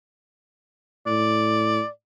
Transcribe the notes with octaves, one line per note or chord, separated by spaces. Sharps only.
A2 D5